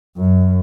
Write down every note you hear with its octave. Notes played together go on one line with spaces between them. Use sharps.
F#2